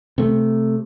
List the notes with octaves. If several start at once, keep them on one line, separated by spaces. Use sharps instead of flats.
C3 A3